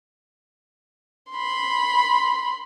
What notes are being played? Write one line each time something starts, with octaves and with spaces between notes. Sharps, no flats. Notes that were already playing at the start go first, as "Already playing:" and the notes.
B5 C6